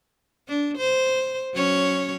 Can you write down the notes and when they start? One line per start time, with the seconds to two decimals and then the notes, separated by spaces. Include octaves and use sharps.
0.48 D4
0.78 C5
1.54 F#3 C#4 C#5